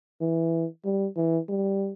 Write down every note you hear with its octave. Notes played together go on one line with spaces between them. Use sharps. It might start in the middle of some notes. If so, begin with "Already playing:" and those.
E3
G3
E3
G3